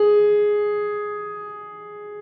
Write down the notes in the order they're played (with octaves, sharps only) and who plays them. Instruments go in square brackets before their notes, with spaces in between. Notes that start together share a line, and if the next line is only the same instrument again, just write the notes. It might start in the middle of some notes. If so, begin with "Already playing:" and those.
Already playing: [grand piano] G#4